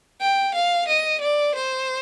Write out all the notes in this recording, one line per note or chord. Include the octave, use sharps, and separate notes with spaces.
G5
F5
D#5
D5
C5